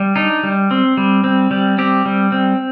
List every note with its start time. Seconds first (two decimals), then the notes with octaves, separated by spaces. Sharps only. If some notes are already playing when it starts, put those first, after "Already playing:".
Already playing: G3
0.16 D4 D#4
0.43 G3
0.71 C4
0.97 G3
1.24 C4
1.51 G3
1.78 C4 G4
2.06 G3
2.32 C4